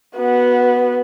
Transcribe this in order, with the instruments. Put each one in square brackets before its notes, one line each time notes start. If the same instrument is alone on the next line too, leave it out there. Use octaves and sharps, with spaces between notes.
[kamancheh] B3 F#4